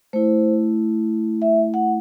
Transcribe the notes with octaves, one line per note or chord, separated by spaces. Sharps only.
A3 E4 C5
E5
F#5